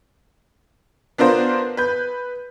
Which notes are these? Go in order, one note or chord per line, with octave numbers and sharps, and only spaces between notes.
B3 D4 F4 A#4 C5
B4 G6